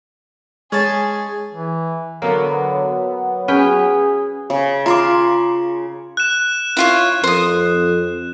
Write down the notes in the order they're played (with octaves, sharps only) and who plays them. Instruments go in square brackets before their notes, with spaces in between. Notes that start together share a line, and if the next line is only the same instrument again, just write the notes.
[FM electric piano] G#3 [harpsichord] C#4 A5 [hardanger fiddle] G#4
[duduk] E3
[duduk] D3 [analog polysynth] F#3 B3 [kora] A#3
[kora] C#4 B4 G5 [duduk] G#4
[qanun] C#3
[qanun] F4 [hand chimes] A#5 C6 D6
[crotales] F#6 E7
[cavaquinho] E4 F4 C#5
[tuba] F2 [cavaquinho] C5 D#6